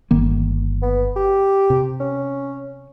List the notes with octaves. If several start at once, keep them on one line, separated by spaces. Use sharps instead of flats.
G1 D#3 A#3
B3
G4
C3
C#4